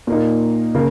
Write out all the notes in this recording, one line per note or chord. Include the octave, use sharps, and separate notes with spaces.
A#2 A#3 D#4
C#3 A#3